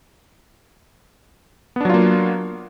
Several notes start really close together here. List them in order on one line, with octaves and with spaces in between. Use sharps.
B3 D4 F#3 F4 A#3